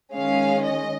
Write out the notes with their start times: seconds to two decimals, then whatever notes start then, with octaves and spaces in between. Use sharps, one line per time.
0.15 D#3 G#3 C#4 F5
0.64 D#5